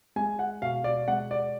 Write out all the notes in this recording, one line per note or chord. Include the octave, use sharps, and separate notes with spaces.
G#3 G#5
F#5
B2 F5
D5
G#3 F#5
D5